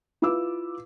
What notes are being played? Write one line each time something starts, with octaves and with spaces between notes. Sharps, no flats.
E4 F4 B4 D6 E6